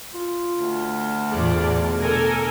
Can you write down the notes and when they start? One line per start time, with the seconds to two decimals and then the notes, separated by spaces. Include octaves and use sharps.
0.14 F4
0.59 D2
1.31 E2 A2 F4 G#4 D5
1.68 B2
1.99 D4 A4 A#4 G#5